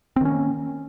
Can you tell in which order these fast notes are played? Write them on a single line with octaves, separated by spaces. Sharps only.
C4 D#3 C#4 A#3